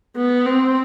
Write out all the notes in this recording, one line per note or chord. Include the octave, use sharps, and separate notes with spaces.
B3
C4